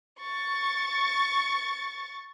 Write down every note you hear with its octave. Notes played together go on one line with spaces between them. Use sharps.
C#6 A6